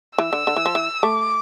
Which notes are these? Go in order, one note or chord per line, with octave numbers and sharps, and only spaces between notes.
E3 E6
D3
D3
E3
F3
E3
A3 D6